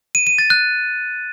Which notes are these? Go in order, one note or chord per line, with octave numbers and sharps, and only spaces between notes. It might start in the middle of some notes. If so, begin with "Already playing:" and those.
D#7
D#7
A6
F#6